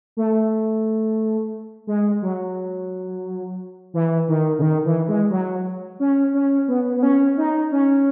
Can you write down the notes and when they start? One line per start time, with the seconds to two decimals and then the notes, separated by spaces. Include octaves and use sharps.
0.17 A3
1.87 G#3
2.22 F#3
3.94 E3
4.28 D#3
4.59 C#3
4.62 D#3
4.85 E3
5.08 G#3
5.31 F#3
6.00 C#4
6.34 C#4
6.68 B3
6.97 B3
7.03 C#4
7.37 D#4
7.72 C#4